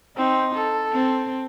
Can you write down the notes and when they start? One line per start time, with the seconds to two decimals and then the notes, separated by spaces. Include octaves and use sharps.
0.16 C4 D#4
0.55 A4
0.92 C4